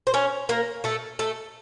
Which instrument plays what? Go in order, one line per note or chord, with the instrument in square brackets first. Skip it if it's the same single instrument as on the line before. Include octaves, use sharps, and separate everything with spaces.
[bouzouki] C5
C#4 C#5
A#3 A#4
A3 A4
A3 A4